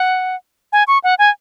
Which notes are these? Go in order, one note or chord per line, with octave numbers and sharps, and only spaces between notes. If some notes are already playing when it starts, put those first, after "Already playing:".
Already playing: F#5
G#5
C#6
F#5
G#5